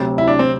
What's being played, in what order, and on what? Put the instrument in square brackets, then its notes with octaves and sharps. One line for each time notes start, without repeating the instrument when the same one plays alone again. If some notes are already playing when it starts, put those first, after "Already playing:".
Already playing: [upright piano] D2 C3 F#3
[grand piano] E4
D4
C4